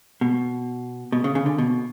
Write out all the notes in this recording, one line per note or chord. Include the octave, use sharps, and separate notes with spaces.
B2
B2
C#3
C#3
D3
B2